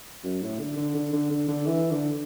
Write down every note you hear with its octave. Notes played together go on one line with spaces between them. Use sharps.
F#2
A2
D3
D3
D3
D3
D3
D3
E3
D3